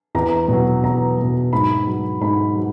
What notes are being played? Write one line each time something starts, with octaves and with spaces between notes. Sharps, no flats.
E2 A#5
B2 F#3
E2 A#5
B2 F#3
G#2 B5
F#3
G#2 B5
F#3